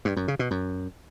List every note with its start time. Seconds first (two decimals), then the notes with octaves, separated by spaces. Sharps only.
0.05 G2
0.17 F#2
0.28 C#3
0.39 B2
0.51 F#2